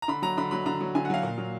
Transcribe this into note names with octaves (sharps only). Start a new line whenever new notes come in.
A#5
D3 B5
F#3 A#5
D3 B5
F#3 B5
D3 A#5
F#3
D3 G#5
F#5
F#3 F5
A#2
F#3